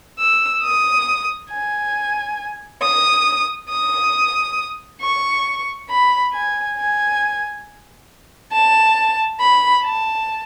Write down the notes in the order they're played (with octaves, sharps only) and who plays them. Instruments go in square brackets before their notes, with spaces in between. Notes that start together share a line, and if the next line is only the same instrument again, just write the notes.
[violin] E6
D#6
G#5
D#6
D#6
C#6
B5
G#5
G#5
A5
B5
A5